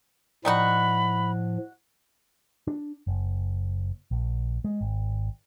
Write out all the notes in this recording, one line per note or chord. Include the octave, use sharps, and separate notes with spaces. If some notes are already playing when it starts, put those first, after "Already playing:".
A2 F3 G3 D#4 F#4 B5
D4
F#1
A#1
G#3
G#1